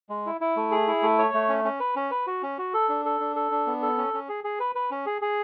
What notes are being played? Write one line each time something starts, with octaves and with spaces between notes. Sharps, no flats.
G#3
E4
E4
A3
G#4
E4
A3
C#5
A3
C#4
C#4
B4
C#4
B4
F#4
C#4
F#4
A4
D4
A4
D4
A4
D4
B3
A4
C#4
C#4
G#4
G#4
B4
B4
C#4
G#4
G#4